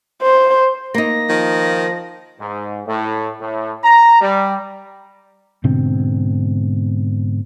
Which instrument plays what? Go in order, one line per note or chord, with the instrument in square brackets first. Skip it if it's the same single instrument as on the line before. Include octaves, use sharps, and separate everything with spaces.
[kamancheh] C5
[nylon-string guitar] A#3 D#4 [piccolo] A#6
[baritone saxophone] D#3 [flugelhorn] F3
[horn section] G#2
A2
A2
A#5
G3
[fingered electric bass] G#2 B2 D3 C4